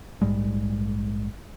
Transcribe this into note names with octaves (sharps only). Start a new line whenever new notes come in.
A#1 G#2 G3 G#3